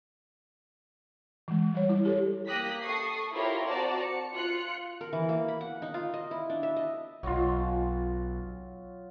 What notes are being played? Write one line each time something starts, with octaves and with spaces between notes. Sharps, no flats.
E3 G#3
G3 C#5
E4
G4 A4 C#5
A#3 G4 D#6 F#6 A#6 B6
A4 C#6 D#6 C7
E4 F4 G4 A#4 C#5
C4 F#4 D5 A5 A#5
C#7
F4 F#6 C#7
A#4
E3
A#3
B5
F#5
D#4
F4
D#5
E4
D4
E5
D#5
B1 F#3 F4